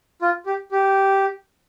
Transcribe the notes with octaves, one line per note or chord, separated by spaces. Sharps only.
F4
G4
G4